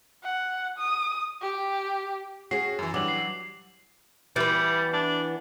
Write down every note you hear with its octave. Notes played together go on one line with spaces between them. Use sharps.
F#5
D#6
G4
C#4 F#4 G#4 C7
F#2 E3
E3 F#3 G3 D4 D6 F#7
C7
E3 G3 B3
D4